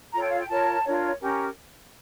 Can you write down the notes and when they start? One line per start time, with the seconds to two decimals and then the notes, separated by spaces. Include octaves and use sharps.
0.13 F4 A4 C#5 A#5
0.23 G5
0.31 F5
0.40 G5
0.49 F4 A#4 C#5 A5
0.84 D4 F4 A#4 C#5
1.19 C#4 G4 A#4